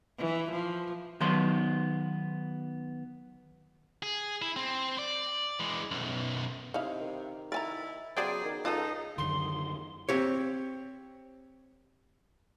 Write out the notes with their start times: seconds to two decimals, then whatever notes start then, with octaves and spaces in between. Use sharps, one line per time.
0.18 E3
0.52 F3
1.20 D#3 F#3 B3 A5 C6
4.03 G#4
4.42 E4
4.56 C4
4.98 D5
5.60 E3 G#3
5.91 B1 F#2
6.74 C3 D#4 E4 F5
7.01 D#3
7.52 E4 A#4 G#5 A#5 A6
8.17 C#3 E3 F#3 B3 G#4 C5 D5 G5
8.44 D#3
8.65 C#2 D#4 F4 A4 A5 D#6
9.18 F#2 D3 D#3 C6
10.09 C4 G4 C#5